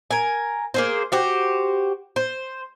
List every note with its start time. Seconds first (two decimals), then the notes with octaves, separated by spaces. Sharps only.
0.11 A#4 G#5
0.74 A#3 G#4 C5
1.12 F#4 G4 C5
2.16 C5